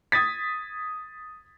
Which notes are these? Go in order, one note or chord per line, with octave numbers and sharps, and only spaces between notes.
D#6 G#6 A6 B6